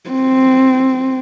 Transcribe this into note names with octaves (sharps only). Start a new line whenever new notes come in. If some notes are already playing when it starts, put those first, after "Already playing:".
C4